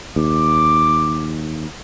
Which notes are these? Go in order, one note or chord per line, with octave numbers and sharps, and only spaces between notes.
D#2 D6